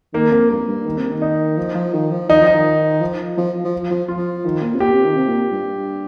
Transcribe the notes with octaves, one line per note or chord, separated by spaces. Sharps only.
D#3 A#3
F2 A#3
G2 A#3
G2
D#3
C3
D#3
D#4
F3
F3
D#3
F3
D#3 D#4
F3
D#4
D#3
F3
F3
F3
F3
F4
F3
D#3
A#2
C3
A#2 G4
C3
D#3
C3
A#2
G2